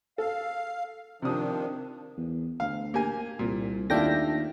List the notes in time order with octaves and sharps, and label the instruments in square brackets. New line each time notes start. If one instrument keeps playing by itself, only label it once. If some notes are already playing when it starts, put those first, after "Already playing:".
[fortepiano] A4 [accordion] F5
[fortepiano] C3 D#6 [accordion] D#3 F3 D4
[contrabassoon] E2
[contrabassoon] D2 [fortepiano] F5
[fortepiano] A#3 G4 G#5
[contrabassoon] C2 [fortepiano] A#2
[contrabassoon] D#2 [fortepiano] A3 E4 F4 [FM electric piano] D4 G5 A#6